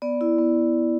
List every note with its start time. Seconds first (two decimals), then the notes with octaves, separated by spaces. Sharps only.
0.02 B3 D5
0.21 E4
0.39 B3